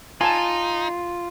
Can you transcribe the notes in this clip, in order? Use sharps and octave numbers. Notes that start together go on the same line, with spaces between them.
D#4 F4 G#5 A5